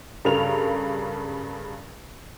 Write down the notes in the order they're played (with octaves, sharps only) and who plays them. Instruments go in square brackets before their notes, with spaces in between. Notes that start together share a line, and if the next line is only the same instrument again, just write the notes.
[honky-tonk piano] G2 C#3 A4 A#4 F7